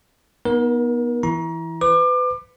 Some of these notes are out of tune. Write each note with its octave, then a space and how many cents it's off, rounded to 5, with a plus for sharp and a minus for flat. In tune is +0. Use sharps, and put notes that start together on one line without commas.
B3 -25 D#4 +0 A#4 +35
E3 +0 E4 +0 A#5 +30
B4 +30 D6 +30